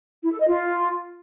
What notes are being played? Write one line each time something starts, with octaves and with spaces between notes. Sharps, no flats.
E4
A4
D#5
F4